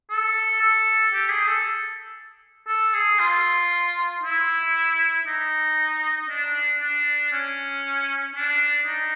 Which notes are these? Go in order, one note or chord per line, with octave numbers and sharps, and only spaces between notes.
A4
A4
G4
G#4
A4
A4
G#4
F4
E4
D#4
D4
D4
C#4
D4
D#4